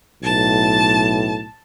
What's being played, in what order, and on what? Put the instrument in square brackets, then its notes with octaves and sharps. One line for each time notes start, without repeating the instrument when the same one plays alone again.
[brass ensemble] B1 A2 [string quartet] A5